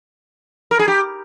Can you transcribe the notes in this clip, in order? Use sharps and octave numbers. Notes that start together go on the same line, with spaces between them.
A#4
G#4
G4